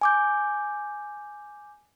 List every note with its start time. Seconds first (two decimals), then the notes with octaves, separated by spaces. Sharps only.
0.01 G#5 D6 G6